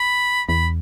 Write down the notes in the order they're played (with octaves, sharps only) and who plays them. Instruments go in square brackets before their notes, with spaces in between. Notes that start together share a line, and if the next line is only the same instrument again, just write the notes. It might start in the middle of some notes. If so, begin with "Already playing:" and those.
Already playing: [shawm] B5
[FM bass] E2 [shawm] B5